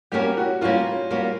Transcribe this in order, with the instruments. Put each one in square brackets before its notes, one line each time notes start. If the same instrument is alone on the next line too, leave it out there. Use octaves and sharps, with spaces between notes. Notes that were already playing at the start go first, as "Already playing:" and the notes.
[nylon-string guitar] G3 A#3 C#4 F#4 A#4 [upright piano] G4
[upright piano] F#4
[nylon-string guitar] G3 A#3 C#4 F#4 A#4 [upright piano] F4
[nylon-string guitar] G3 A#3 C#4 F#4 A#4